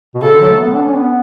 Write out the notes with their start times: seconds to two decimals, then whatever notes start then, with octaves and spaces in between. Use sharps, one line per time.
0.15 B2
0.22 C#3 A4
0.31 D3
0.41 F#3
0.50 A3
0.58 B3
0.75 D4
0.85 C#4
0.95 B3